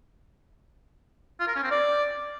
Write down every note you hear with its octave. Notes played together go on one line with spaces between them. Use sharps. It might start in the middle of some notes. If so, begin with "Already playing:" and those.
F4
A#4
C#4
C4
D5